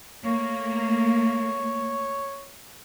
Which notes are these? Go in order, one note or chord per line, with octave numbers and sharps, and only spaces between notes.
A3 A#3 C#5